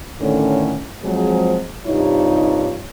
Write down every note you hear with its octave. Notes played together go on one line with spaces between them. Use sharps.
A2 D3 D#3 B3 C#4
F3 F#3 G#3 C4 G#4
G2 C3 D#4 F4 C#5